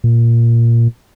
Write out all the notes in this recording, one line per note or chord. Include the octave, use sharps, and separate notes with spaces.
A#2